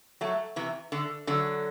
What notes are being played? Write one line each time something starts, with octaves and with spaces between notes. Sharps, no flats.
F#3 A3
C3 E3
D3
D3 F#3